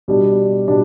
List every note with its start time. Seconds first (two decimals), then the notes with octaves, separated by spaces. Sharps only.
0.08 B2 G3 D4
0.68 B2 G3 D4